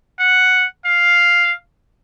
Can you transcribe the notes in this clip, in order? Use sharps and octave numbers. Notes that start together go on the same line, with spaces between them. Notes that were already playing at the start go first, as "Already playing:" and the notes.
F#5
F5